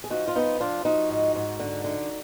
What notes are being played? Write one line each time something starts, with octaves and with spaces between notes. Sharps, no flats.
G#4
F3 D#4 F#4
F4
F2 B3 D#4
F3 D4 F4
F3 D#4 F#4
G#2
G#2
D3
D3